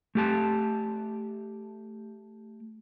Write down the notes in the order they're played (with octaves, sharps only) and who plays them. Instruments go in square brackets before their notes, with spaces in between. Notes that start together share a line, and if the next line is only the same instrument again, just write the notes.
[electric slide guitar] A3 G4 A5